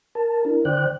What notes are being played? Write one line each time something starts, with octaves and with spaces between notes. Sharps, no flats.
A#4 A5
D4 E4 A#4
D3 C5 D5 G5 F#6